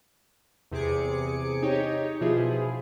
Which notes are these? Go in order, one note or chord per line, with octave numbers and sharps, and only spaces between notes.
E2 C3 G#4 D6 C#7
D#4 G4 C#5
B2 F3 E4 F4 G#4